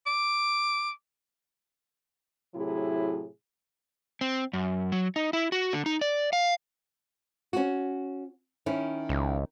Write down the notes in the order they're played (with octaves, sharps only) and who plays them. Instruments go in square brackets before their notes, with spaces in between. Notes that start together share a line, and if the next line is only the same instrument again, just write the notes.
[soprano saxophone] D6
[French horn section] A2 C3 F#3 E4 G#4
[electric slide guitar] C4
F#2
F#3
D#4
E4
F#4
D3
D#4
D5
F5
[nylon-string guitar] C#4 F#4
D#3 C#4 E4
[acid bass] C#2